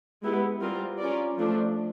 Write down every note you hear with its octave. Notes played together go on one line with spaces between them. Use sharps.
G#3 B3 E4 G4
G3 C4 F4 A#4
C#4 F4 A#4 D5
F3 A3 D4